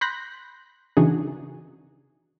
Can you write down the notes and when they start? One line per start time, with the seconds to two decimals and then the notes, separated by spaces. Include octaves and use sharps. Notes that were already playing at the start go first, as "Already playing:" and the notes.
0.01 B5 C6 F#6 G6 A#6 B6
0.97 C#3 E3 D4 D#4 F#4 G#4